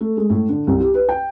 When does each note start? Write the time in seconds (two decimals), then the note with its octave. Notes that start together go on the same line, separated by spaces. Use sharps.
0.01 A3
0.17 G#3
0.30 A2
0.49 D3
0.67 C2
0.80 G4
0.94 B4
1.09 G5